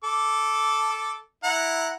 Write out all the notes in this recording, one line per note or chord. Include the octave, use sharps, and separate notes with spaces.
A4 D6
E4 F#5 A#5